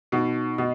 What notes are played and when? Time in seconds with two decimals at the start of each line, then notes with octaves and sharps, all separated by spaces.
0.12 B2 D#4
0.58 B2 D#5